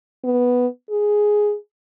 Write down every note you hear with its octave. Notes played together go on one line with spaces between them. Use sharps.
B3
G#4